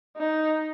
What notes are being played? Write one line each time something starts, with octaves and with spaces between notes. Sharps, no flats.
D#4